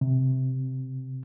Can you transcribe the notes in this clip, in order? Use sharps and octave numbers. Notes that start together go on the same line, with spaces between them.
C3